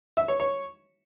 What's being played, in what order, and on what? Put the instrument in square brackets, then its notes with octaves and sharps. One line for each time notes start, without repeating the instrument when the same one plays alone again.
[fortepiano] E5
C#5
C#5